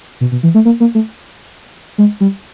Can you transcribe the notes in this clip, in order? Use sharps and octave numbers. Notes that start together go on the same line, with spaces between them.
B2
B2
E3
A3
A#3
A#3
A3
G#3
G3